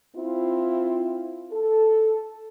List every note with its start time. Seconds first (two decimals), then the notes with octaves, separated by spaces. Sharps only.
0.16 C4 E4 F4
1.52 A4